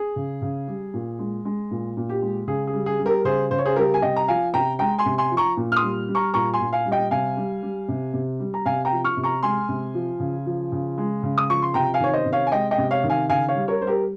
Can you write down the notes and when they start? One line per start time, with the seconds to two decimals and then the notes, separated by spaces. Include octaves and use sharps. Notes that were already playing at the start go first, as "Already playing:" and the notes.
Already playing: G#4
0.16 C#3
0.42 C#3
0.68 G3
0.94 A#2
1.19 G#3
1.45 G#3
1.71 A#2
1.97 A#2
2.09 G4
2.22 G#3
2.47 C#3 G#4
2.67 G#4
2.74 G3
2.86 G#4
2.99 G3
3.06 G4 A#4
3.25 C#3 G#4 C5
3.51 C#3 C5
3.58 C#5
3.66 G#4 C5
3.76 G3 G4 A#4
3.94 G#5
4.02 C3 D#5 G5
4.16 A#5
4.28 F3 F5 G#5
4.54 C3 G5 A#5
4.79 G#3 G5 A#5
4.99 G#5 C6
5.06 C3
5.18 G#5 C6
5.31 F3
5.37 A#5 C#6
5.57 A#2
5.72 F6
5.76 C6 D#6
5.82 G3
6.09 G3
6.15 A#5 C#6
6.34 A#2 A#5 C#6
6.54 G#5 C6
6.60 A#2
6.73 F5 G#5
6.86 G3
6.92 D#5 G5
7.11 C3 F5 G#5
7.37 G3
7.63 G3
7.88 C3
8.14 C3
8.40 G3
8.54 A#5
8.66 C3 F5 G#5
8.85 G5 A#5
8.92 F3
9.04 C#6 F6
9.17 C3
9.23 A#5 C#6
9.43 G#3 G#5 C6
9.69 C3
9.94 F3
10.20 C#3
10.46 F3
10.72 C#3
10.98 G#3
11.23 C#3
11.38 D#6
11.49 F3 C#6
11.62 C6
11.74 C3 G5 A#5
11.94 F5 G#5
12.00 D#3 C#5
12.14 C5 D#5
12.26 C3
12.33 C#5 F5
12.47 G#5
12.52 G#3 D#5 G5
12.71 D#5 G5
12.78 C3
12.91 C#5 F5
13.04 D#3
13.10 F5 G#5
13.29 C#3 F5 G#5
13.48 C#5 F5
13.55 G3
13.68 A#4 C#5
13.81 G3 C5
13.87 G4 A#4